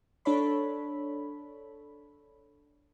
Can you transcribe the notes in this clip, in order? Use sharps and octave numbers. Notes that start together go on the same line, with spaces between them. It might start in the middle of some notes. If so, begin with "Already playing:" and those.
D4 A4 C#5 B5